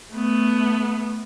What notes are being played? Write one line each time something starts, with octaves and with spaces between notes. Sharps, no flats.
A3 B3